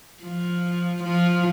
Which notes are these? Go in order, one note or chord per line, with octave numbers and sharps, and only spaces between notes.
F3
F3